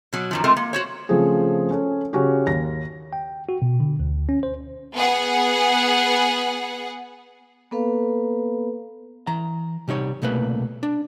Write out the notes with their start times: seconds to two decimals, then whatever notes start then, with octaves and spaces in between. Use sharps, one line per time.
0.13 B2 F#3
0.31 F#2 D#3 F3
0.44 G#3 A3 C4 F4 A#4
0.57 A#3
0.73 F#4 C5 C#5
1.09 C#3 F3 A3 C4 G#4
1.71 C#4 A4
2.13 C#3 C#4 F#4 G4
2.47 D#2 A#6
3.13 G5
3.49 F#4
3.62 B2
3.80 D3
3.99 D2
4.29 C#4
4.43 C5
4.93 B3 G#4 F#5
7.71 A#3 B3 A4 B4 F5
9.27 E3 A#5
9.88 C3 G3 D#4 C#5
10.22 C2 B2 A3 A#3 B4
10.83 D4